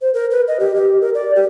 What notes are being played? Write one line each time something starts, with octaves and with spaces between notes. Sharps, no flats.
C5
A#4
B4
D#5
G4
G4
A#4
D5
G4